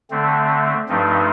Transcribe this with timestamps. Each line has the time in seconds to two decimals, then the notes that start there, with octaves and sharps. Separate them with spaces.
0.10 D3 A3 C4
0.89 G2 F3 A3 C4 D#4